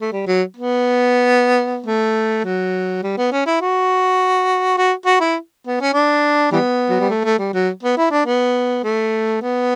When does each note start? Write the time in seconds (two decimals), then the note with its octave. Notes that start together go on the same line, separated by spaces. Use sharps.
0.01 A3
0.12 G3
0.27 F#3
0.56 B3
1.86 A3
2.45 F#3
3.03 G3
3.18 B3
3.32 C#4
3.46 E4
3.61 F#4
4.77 F#4
5.06 F#4
5.20 E4
5.67 B3
5.81 C#4
5.94 D4
6.52 E3 G3 B3
6.90 F#3
7.00 G3
7.10 A3
7.24 A3
7.39 G3
7.54 F#3
7.83 B3
7.97 E4
8.11 D4
8.25 B3
8.84 A3
9.42 B3